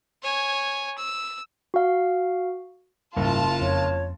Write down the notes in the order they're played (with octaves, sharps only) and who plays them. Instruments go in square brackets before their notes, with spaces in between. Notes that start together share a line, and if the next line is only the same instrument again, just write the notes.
[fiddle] C#5 G#5
E6
[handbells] F#4 F5
[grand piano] F#1 [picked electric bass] G#2 G3 [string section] F4 A5
[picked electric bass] F2 [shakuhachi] C#5